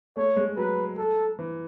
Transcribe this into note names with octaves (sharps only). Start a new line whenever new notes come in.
A3 C#5
G#3
F#3 B4
A4
E3